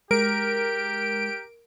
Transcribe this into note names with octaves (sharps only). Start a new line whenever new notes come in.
G#3 G4 A#4 D7